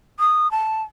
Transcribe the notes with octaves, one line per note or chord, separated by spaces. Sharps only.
D#6
A5